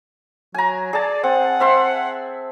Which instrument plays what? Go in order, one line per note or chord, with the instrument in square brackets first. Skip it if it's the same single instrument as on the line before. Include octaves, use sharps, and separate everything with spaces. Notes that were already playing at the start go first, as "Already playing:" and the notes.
[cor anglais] F#3 [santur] G#5 A#5
[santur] G#4 A5 [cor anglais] D5
[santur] C4 [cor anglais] F#5
[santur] C4 E5 C6